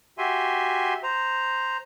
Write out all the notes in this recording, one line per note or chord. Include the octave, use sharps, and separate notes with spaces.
F#4 G4 E5 G#5 C6
C5 A#5